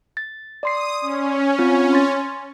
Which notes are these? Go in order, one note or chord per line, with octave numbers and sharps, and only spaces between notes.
A6
D5 C6 D#6 C7
C#4
C4 F4
C6 A6